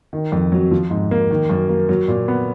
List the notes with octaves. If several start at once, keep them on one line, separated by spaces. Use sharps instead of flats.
D#3
F2
F#3
F3
G#2
A#3
D#3
F#2
A#3
F#3
A#2
B3